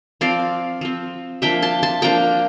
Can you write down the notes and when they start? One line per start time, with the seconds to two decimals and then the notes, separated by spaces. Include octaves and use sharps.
0.21 F3 C4 D5 F5
0.81 F3 C4
1.42 F3 A#3 D4 E5 G5
1.62 A5 C6
1.83 A5 C6
2.02 F3 A#3 D4 G5 A#5